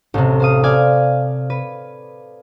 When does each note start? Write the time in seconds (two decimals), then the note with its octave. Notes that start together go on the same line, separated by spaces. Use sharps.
0.14 A1 C3
0.40 C5 F5 D#6
0.64 D5 F5 G#5 G#6
1.50 B4